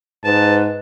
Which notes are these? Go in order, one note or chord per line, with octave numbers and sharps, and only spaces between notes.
G#2 B4 A5